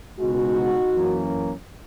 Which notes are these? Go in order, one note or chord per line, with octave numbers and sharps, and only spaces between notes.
C#2 B2 G#3 D#4 F#4
F#2 E3 A#3 C#4